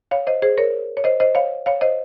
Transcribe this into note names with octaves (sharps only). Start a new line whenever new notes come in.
C#5 F5
C5 D#5
G#4 C5
A#4 C#5
C#5
C5 D#5
C5 D#5
C#5 F5
C#5 F5
C5 D#5